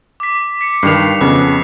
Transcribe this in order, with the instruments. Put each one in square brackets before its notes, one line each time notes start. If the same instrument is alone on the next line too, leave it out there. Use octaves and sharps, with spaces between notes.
[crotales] D6 B6
B6 C#7
[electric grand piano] G2 D#3 [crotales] C7 F7
[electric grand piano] F2 C#3 B3 [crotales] F#6